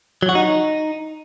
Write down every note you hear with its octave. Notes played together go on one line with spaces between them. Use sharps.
F#3
F#4
D#4